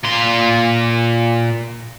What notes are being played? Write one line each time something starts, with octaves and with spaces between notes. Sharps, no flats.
A#2 C6